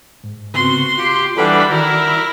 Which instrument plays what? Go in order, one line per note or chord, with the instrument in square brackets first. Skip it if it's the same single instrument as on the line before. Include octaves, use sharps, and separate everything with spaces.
[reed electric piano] G#2
[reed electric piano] C#3 B3 C4 [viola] F#4 C6
[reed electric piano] F4 [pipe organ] G4
[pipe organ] E3 G3 D4 [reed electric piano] A4 B4 F#5 [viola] B5
[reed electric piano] D#3 F#4 D5 [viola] E4 [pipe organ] A#4